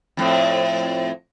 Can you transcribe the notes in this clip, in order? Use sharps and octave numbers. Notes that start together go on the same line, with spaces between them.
F2 A2 C4